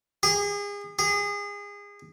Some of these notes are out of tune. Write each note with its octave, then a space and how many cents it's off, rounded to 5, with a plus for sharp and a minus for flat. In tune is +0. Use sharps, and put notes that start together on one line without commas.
G#4 -35
G#4 -30